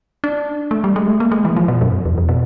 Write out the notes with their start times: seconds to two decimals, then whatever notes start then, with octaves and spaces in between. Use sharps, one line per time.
0.24 D4
0.71 A3
0.84 G3
0.96 G#3
1.07 A3
1.20 A#3
1.32 G#3
1.45 E3
1.56 F3
1.68 B2
1.81 F#2
2.05 E2
2.18 F2
2.29 B2